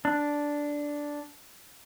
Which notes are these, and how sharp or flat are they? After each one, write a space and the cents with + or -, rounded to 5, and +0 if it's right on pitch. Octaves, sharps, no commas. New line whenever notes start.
D4 -5